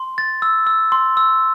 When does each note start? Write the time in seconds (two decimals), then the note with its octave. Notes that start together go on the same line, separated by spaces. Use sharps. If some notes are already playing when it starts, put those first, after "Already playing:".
Already playing: C6
0.18 A6
0.42 E6
0.67 E6
0.92 C6
1.17 E6